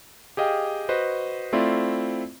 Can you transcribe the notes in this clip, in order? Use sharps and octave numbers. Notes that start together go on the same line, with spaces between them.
G4 G#4 D#5 F5 G5
F#4 B4 C5 D#5
A3 C4 E4 F4 D5